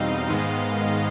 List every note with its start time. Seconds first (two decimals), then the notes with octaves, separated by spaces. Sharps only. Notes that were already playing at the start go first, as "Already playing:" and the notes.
Already playing: E2 B2 G3 C4 D#4 D#5 F5
0.29 G#2 D#3 G#3 B3